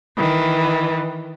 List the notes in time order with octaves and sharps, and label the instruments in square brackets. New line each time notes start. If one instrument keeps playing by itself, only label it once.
[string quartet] D#3 E3